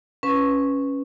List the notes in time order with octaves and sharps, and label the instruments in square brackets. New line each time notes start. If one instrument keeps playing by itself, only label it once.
[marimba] C#4 B4